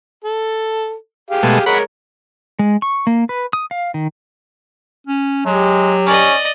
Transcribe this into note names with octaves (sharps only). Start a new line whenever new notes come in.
A4
G4 G#4 F5
B2 G#3 A3
G#3 A#4 C#5 F#5 B5
G#3
C#6
A#3
B4
D#6
F5
D#3
C#4
F#3 G#3 G4
C#4 D5 D#5